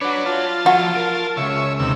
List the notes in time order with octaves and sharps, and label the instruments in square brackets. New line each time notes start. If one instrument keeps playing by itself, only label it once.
[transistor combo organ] D4 B4 [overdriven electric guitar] C#5 F#5
[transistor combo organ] F4 A5
[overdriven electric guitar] F3 A#5 [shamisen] F#4
[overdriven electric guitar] A#4
[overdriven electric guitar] C#2 [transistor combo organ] C#5 E5
[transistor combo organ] D#2 C3 E6